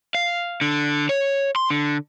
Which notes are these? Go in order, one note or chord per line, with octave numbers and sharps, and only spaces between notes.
F5
D3
C#5
C6
D3